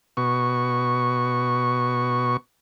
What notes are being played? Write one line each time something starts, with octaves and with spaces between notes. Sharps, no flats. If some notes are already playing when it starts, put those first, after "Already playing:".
B2 C#6